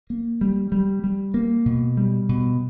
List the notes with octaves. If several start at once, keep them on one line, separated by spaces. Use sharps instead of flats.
A#3
G3
G3
G3
A#3
B2
G3
B2